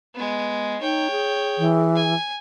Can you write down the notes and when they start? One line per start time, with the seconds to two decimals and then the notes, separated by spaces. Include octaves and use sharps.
0.15 G#3 B3
0.81 D#4 C#5 G5
1.11 G#4
1.58 E3
1.96 G#5